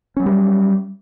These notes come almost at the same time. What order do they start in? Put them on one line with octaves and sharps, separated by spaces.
C#4 F#3 B3 G3